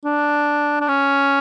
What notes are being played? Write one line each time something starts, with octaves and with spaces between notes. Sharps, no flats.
D4
D4
C#4